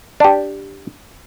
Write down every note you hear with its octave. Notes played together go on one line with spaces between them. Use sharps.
D4 G4